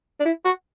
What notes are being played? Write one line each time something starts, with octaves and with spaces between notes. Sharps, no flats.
D4
E4
F#4